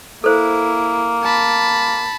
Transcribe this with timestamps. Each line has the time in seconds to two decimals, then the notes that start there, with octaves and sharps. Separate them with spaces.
0.24 A#3 E4 A4 C5
1.23 A5 B5